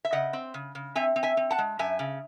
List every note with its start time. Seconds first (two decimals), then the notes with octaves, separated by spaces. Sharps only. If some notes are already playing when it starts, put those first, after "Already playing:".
0.05 E5
0.13 C#3 D#5 F#5
0.33 C4
0.54 C#3
0.75 C#3
0.95 C4 E5 G#5
1.16 C4
1.23 E5 G#5
1.37 C4
1.51 F#5 A5
1.58 G#3
1.79 F#2 E5 G#5
1.99 C#3